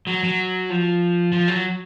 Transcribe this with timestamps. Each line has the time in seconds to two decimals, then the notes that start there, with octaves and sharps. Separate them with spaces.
0.07 F#3
0.23 F#3
0.70 F3
1.32 F3
1.48 F#3